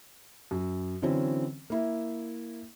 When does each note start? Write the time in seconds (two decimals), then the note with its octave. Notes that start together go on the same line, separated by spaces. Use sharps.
0.51 F#2
1.02 D3 E3 F#3 C4 C#4
1.70 A#3 E4